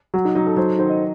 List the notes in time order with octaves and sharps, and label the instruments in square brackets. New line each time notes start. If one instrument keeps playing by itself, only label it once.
[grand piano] F#3 [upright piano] F#4
[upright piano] D#4
[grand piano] F#3 [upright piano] D#4
[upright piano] A4
[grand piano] F#3 [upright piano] C5
[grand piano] D#3 [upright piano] C5
[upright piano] D#5